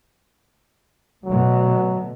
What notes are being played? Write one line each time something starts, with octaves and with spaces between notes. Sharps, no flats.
B2 D3 F#3 A3